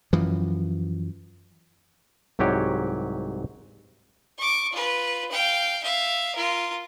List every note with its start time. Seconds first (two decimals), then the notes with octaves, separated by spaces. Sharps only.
0.13 F#2 E3 F3
2.39 C2 G#2 F#3 G4 C#5
4.38 C#6 D6
4.72 F4 B4
5.31 F5 G5
5.83 E5 F5
6.35 F4 A#4